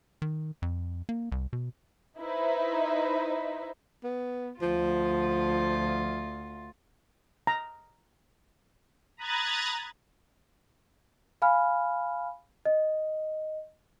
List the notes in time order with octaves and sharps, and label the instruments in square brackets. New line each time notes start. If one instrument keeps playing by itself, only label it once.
[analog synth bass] D#3
F2
A#3
C2
B2
[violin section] D#4 E4 B4 C5 E5
[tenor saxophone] B3
[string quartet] D2 F4 [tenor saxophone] F3
[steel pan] A#5
[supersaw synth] A#5 B5 D#6 F#6 G#6 A6
[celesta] F5 G#5 B5 F6
D#5